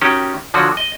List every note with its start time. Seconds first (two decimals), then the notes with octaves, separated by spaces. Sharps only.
0.01 D#3 C#4 F#4 G4
0.54 D3 F3 F#3 F#4
0.77 D#5